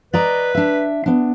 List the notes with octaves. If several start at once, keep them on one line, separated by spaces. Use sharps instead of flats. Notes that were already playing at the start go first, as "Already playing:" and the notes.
B4 D5 D#5 A#5
D4 E5
B3 D4